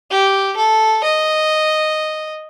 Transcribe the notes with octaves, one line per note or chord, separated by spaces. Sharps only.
G4
A4
D#5